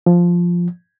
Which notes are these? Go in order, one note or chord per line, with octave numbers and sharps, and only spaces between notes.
F3